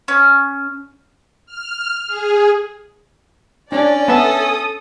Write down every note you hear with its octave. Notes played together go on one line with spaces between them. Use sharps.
C#4
F6
G#4
C#4 D4 D5
B3 A4 E5 A5 D#6